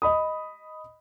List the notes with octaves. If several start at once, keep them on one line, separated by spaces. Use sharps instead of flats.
D#5 B5 D#6